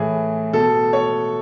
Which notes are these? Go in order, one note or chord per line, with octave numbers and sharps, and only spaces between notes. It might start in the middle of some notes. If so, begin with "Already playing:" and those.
Already playing: A2 E3 G#4
B2 A4
C#5